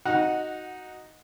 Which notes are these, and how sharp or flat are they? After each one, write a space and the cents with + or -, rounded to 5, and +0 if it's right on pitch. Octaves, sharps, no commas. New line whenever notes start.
D#4 +0 F#4 +0 F#5 -10